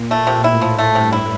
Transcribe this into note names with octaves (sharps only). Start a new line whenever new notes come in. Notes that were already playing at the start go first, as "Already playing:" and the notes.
Already playing: A#2
A3
C3
A2 E4
F3
A3
G2 C3
E4